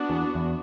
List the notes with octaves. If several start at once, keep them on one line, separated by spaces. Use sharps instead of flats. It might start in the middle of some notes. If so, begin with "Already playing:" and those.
Already playing: B3 D4 F#4
E2
E2